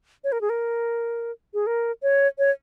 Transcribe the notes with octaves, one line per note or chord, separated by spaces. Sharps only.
C#5
A#4
G#4
A#4
G#4
A#4
C#5
C#5